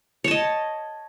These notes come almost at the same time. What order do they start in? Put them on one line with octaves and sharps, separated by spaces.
C#5 A5 D#5